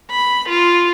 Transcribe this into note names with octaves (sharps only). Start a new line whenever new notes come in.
B5
F4